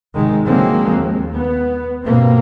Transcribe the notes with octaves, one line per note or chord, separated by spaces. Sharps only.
G#1 C3 D#3 G#3
D3 F3 F#3 G#3 A#3 C4
D#2
B3
G2 B2 A#3 C4